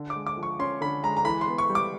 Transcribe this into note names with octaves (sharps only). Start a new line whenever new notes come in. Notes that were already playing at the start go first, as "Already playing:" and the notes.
Already playing: D3
D6
G#3
D6
F3
C#6
C#4 C6
D3 B5
G#3 A#5
A#5
E3 B5
C6
B3
C#6
G3
D6